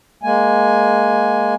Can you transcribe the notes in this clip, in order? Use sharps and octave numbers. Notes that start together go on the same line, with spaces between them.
G#3 A#3 G#5